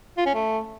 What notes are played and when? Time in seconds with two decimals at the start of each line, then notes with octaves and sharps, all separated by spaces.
0.18 F4
0.26 C#4
0.34 A3